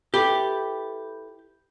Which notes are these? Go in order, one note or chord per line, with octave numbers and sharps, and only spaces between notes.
E4 G4 A4 B4